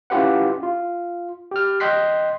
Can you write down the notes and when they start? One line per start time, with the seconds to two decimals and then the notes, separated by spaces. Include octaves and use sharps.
0.10 C#4 E4 F4 G4 B4 F#5
0.63 F4
1.51 G4 F6
1.80 D#5 G5 C6 F#6 B6 C7